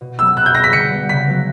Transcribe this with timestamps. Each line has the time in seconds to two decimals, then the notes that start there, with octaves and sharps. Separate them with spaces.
0.01 B2
0.19 F#3 B3 E6
0.37 B2 F#6
0.46 G6
0.55 G3 B3 A#6
0.64 B6
0.73 D3 C#7
0.91 G3 B3 D4
1.09 C#3 B6
1.27 F#3 B3